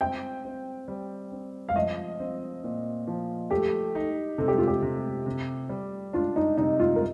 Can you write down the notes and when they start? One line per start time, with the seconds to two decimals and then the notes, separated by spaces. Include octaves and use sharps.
0.01 C4 G5
0.44 C4
0.88 G3
1.32 C4
1.69 F5
1.76 F3 D#5
2.20 C4
2.64 A#2
3.07 F3
3.50 A3 G4
3.95 D#4
4.38 C3 A4
4.48 G4
4.58 F4
4.68 G4
4.82 C3
5.26 C3
5.69 G3
6.13 D4 F4
6.36 D#4
6.57 C3 D#4
6.80 F4
6.96 A#4